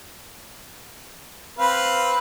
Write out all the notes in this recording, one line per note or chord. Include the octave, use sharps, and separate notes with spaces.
C4 B4 F5